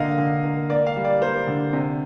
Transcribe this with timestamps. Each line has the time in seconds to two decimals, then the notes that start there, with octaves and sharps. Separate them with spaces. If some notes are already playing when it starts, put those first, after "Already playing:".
Already playing: D3 A#3 D#5 F5
0.18 D3
0.44 A#3
0.70 A#3 D5
0.86 F5
0.96 G3
1.04 D5
1.21 A#3 C5
1.47 D3
1.73 C3